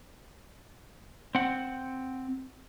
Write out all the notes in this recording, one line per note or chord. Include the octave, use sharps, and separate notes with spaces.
C4 F#5